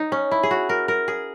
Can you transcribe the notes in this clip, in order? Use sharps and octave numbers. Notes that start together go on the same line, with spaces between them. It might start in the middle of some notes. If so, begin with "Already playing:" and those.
Already playing: D#4
C#4
E4
G#4
F#4
A#4
A#4
G#4